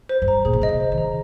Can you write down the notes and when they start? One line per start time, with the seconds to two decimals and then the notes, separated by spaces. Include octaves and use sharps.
0.09 C5
0.22 G2
0.28 A#5
0.45 A#2 G#4
0.53 D#3
0.61 C#3 D#5
0.69 C3
0.80 C5
0.92 D#3
0.98 A#5